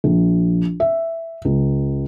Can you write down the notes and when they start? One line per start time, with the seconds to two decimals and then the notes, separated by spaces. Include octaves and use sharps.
0.04 A#1
0.80 E5
1.45 C#2